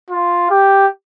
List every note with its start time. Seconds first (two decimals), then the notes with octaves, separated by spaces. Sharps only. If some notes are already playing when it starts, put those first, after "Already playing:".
0.11 F4
0.50 G4